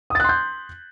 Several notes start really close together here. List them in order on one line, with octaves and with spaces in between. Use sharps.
D#6 A6 F#6 C6 G6